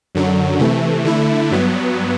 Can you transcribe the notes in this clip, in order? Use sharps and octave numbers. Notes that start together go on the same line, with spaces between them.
F#2 D3 F#3
C3 E3 A3
D3 A3 E4
G2 F#3 B3